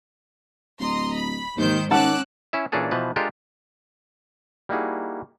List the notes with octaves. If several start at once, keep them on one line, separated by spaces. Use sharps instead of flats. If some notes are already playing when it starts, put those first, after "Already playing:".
D1 D#5 A#5 C6
B5
D#2 G#2 D#3 C5 G6
D#3 C#4 F#5 A5 D6 E6 F#6
C#4 E4 E5
A#2 E3 C#4 D4 G#4 A4
B2 E3 F3 B4
G#3 D4 F4 G4 A4 A#4
G3 A#3 D#4 E4 F#4 G#4